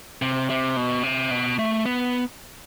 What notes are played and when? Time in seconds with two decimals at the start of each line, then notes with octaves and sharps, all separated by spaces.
0.22 C3
0.50 C3
0.77 B2
1.03 C3
1.31 B2
1.59 A3
1.85 B3